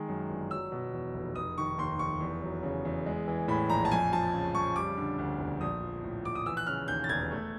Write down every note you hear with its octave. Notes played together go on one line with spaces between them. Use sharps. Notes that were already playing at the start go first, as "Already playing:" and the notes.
Already playing: D#3 G#3
F#2
G1
F#3 E6
B2
E2
F1
F1 D#6
D#3 C#6
D#2 C6
F1 C#6
E2
F#3
C#3
E2
G#3
E3
A2 B5
A#1 A#5
A5
F2 G#5
F3 A5
C#3
F2 C#6
G3 D6
D3
D2
E1
A#1 D#6
F3
A2
A#1 D6
D#6
E3 E6
F#6
C#3 F6
D#2 G6
A6
E1 G#6
A3